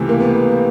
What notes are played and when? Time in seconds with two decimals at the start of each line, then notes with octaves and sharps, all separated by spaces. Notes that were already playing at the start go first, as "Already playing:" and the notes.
Already playing: C#2 C3 E3 A3 C4
0.09 A#3
0.20 B3